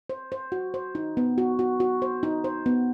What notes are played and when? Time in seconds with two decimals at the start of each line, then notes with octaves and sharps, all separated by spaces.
0.09 C5
0.32 C5
0.52 F#4
0.74 C5
0.95 D#4
1.17 B3
1.38 F#4
1.59 F#4
1.80 F#4
2.02 C5
2.23 D#4
2.44 C5
2.66 B3